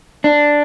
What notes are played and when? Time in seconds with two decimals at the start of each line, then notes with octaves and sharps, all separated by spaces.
0.24 D4